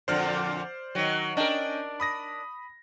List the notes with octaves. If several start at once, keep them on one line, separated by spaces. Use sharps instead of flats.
F2 A#2 D3 C5 D5 F6
D#3 F#3
C#4 D4 A#4 D#5 G5
B5 D#6 A#6